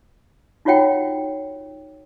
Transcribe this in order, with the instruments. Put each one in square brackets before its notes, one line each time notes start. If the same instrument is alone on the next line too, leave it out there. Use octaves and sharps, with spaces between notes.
[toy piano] D#4 F4 F#4 C#5 F#5 G5